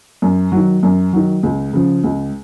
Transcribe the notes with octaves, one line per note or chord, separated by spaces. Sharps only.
F#2
D#3 F#3
F#2
D#3 F#3
C#2
C#3 F3
C#2